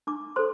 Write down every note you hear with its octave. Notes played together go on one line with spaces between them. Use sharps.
D4 D6
A4 C5 C6